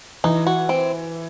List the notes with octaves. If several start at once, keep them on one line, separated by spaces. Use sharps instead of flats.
E3 D#4
F#4
C4